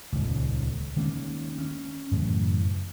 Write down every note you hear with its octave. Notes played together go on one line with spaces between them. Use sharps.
D#1 C#2
D#3 G#3 A#3 C#4
C#4
F#2 A2 C#3 E3